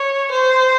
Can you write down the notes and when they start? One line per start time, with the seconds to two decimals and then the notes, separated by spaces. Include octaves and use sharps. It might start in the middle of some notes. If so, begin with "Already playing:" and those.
Already playing: C#5
0.31 C5